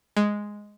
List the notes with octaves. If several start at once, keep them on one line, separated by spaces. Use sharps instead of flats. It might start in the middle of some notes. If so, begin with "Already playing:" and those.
G#3